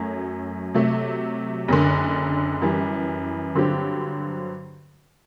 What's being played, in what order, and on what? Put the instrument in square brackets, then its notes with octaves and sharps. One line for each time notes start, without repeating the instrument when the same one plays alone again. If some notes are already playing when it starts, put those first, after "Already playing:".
Already playing: [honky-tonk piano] F#2 F#3 A3
C3 F#3 A3
F#1 F#2 D3
F#2 E3 G3
G2 D3 F#3 C4 G4